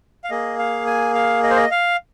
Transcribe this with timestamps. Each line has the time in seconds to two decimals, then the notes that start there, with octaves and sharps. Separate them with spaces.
0.24 F5
0.30 A#3 G#4 D#5
0.59 F5
0.86 G#5
1.14 F5
1.43 D#5
1.50 C5
1.57 D#5
1.71 F5